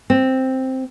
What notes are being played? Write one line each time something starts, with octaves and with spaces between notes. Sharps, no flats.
C4